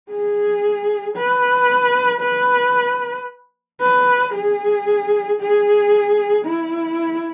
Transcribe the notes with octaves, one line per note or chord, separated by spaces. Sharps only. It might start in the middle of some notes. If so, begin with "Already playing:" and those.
G#4
B4
B4
B4
G#4
G#4
E4